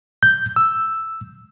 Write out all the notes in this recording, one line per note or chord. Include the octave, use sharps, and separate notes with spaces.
G6
E6